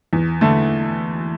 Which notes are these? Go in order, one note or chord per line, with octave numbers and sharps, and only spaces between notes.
E2
D3 A3